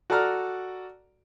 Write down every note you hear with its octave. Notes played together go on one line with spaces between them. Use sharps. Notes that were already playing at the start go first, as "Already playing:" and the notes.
F#4 A4 D5 A#5 F6